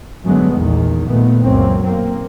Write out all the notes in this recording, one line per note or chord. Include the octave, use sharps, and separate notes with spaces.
F#2 D3 F#3 G#3 A3 B3
A#1 E2 D#3
A#2 D#3 A3 B3
C#2 F#2 F#3 A#3 C4
B1 A#3 C4